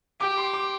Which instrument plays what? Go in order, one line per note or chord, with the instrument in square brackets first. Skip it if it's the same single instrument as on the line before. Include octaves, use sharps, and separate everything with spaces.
[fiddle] G4 [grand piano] D6
[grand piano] C6
D6